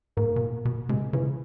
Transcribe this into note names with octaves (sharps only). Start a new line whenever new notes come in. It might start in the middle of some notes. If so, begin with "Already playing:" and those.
G#2 A#3
B2
A#2
B2
C3 G#3
C#3 E3